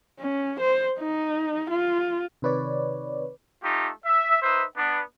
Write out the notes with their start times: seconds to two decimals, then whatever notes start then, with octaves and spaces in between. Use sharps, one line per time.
0.19 C#4
0.61 C5
0.99 D#4
1.71 F4
2.42 C3 D#3 B4 C#5 D5
3.64 A3 D#4 F4 G4
4.06 E5
4.42 D#4 B4 C5 E5
4.76 B3 D4